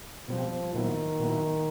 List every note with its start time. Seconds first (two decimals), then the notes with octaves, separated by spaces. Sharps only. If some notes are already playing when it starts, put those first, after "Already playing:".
0.28 B2 F3 G3 C4
0.74 A#2 D#3 F#3 B3 E4
1.19 A#2 F#3 B3 E4